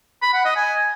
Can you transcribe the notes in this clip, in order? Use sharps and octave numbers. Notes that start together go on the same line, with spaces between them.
B5
F#5
D#5
G#5